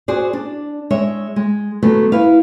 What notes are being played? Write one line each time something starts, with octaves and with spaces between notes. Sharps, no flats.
F#4 G#4 C5 D5
D4
G#3 C#5 E5
G#3
D3 F#3 A3 B3
E4 B4 F5